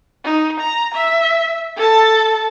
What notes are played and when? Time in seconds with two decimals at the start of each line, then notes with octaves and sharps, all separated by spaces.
0.24 D#4
0.60 A#5
0.94 E5
1.77 A4 A5